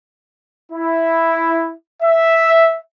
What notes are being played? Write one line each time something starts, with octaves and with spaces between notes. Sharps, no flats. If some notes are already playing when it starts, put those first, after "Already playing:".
E4
E5